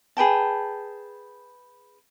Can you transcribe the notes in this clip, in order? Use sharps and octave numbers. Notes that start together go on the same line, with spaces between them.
G#4 B4 G5 A5